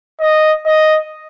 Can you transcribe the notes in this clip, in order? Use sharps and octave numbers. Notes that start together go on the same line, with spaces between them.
D#5
D#5